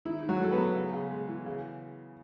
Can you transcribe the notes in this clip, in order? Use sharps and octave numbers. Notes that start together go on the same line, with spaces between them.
D#3 E4
D#3
F#3 F#4
A3 A4
B3 B4
F#3
C#3
C#3
G#3
E3
C#3